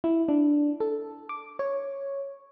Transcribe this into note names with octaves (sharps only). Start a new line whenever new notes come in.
E4
D4
A4
D6
C#5